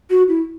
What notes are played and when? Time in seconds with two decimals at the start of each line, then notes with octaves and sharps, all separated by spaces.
0.10 F#4
0.29 E4